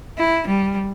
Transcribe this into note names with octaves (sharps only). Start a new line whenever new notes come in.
E4
G3